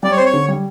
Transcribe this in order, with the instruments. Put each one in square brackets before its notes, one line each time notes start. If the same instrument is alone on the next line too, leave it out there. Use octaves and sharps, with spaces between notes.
[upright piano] G3 [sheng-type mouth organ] D5
[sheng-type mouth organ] C#5
[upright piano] C4 [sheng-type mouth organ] C5
[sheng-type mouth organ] C#5
[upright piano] D3
G3